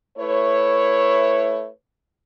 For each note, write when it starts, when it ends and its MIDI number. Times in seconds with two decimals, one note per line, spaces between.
0.18 1.69 57
0.18 1.69 64
0.18 1.69 71
0.18 1.69 73